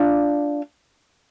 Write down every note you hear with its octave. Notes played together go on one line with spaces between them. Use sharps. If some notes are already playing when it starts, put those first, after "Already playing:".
Already playing: D4 F4